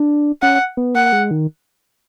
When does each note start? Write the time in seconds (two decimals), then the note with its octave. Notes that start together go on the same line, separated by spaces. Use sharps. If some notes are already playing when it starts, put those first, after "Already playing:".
Already playing: D4
0.42 C#4 F#5
0.77 B3
0.95 A#3 F#5
1.12 G#3
1.31 D#3